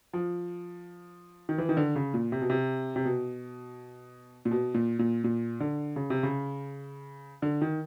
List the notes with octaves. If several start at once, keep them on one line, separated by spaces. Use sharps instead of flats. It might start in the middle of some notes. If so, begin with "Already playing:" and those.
F3
D#3
E3
D#3
D3
C#3
A#2
C3
B2
C3
C3
B2
A#2
B2
A#2
A#2
A#2
D3
C#3
C3
C#3
D3
D#3